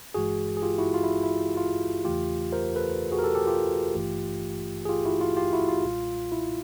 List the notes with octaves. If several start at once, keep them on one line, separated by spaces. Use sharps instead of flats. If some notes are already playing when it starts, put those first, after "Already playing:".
G1 G2 E3 G#3 F#4 G#4
G#4
F4 G4
E4 F#4
F4
E4
E4
F4
E2 C#3 E3 A3 F4 G4
A#4 C5
A4 B4
F#4 G#4
A#4
G4 A4
G4 A4
F4 G4
G#1 G2 E3 A3
G#4
F4 G4
E4 F#4
F4
F4 G4
E4 F#4
F4
B1 A#2 G3
E4